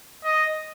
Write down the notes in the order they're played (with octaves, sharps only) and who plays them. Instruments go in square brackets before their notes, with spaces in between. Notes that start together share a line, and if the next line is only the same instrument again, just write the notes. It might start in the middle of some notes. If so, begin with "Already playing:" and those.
[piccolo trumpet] D#5